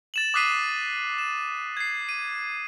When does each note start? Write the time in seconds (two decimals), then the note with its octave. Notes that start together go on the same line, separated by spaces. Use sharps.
0.14 A6 E7 F#7
0.34 D6 D#6 F#6 B6 C7 D#7
1.18 E7
1.77 G#6 C7
2.09 D#7